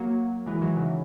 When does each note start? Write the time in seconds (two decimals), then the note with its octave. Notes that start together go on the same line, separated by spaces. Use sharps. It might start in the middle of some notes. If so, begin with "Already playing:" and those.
Already playing: F#3 A#3
0.46 E3 G#3
0.62 D#3 F#3
0.77 C#3 E3